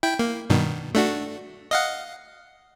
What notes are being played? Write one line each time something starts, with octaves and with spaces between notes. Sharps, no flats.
E4 G5
A#3
G2 B2 D#3
A3 D4 F#4
D#5 F5 F#5